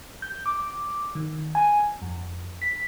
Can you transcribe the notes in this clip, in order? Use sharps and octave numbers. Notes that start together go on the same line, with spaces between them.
G6
D6
D#3
G#5
F2
B6